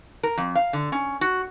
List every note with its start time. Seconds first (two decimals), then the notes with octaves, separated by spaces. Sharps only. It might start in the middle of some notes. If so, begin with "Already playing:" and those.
0.23 A#4
0.38 F2
0.55 F5
0.73 D3
0.92 C#4
1.21 F#4